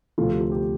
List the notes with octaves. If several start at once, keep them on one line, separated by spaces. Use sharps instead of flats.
D2 C3 F3 A3 F4 A4
G4
F4
G4